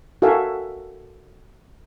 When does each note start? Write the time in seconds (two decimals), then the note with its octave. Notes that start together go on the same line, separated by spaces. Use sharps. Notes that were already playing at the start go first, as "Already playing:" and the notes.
0.22 F#4 A4 A#4 E5 F5 G#5